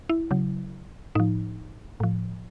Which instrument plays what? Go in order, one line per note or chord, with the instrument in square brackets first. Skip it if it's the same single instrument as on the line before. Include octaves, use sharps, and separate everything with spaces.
[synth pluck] E4
C#3 F#3
A2 F3 D#4
A2 F3